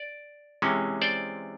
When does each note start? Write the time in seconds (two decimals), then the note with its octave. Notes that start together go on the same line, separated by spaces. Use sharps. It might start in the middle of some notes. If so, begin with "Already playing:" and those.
Already playing: D5
0.62 C3 E3 G#3 C#4
1.02 C5 D5